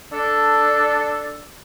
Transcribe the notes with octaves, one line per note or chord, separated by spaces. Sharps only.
D4 A4